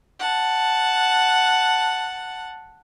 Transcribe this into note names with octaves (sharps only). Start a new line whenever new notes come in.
F#5 A5